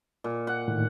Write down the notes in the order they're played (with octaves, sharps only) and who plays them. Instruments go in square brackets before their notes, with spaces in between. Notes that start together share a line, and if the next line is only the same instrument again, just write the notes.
[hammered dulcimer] A#2
F#5
[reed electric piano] A2 D#3